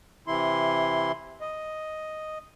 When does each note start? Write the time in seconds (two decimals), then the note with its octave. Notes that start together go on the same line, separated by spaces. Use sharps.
0.27 C3 E3 E4 C6
1.41 D#5